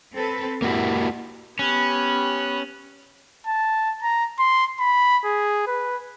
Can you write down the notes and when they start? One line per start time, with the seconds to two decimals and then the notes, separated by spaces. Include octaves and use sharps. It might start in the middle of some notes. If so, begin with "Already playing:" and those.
0.14 C4 A4 B4
0.62 A#3 E4 F#4 G4
1.59 B3 C#4 G4 B5 F#6
3.46 A5
4.02 A#5
4.39 C6
4.80 B5
5.25 G#4
5.67 B4